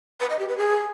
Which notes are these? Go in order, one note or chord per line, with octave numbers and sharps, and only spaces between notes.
B4
D#5
G4
B4
G#4